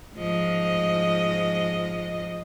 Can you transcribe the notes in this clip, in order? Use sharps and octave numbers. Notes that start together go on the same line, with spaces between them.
G#2 F3 D#5